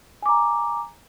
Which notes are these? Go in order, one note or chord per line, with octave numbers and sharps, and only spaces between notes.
G#5 A#5 D6